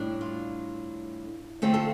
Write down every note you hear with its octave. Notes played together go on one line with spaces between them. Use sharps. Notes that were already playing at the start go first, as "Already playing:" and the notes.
Already playing: A2 G3 D4
F4
D3 A3 C4 F4 G4
F4 A4